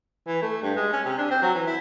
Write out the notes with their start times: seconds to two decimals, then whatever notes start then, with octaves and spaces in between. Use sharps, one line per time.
0.27 E3
0.42 A3
0.62 G2
0.76 G#3
0.93 C#4
1.04 C3
1.18 D4
1.30 C4
1.42 F#3
1.55 E3
1.67 E4